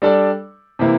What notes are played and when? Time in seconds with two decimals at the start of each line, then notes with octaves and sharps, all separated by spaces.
0.02 G3 D4 A4 D5
0.79 C3 E3 A#3 E4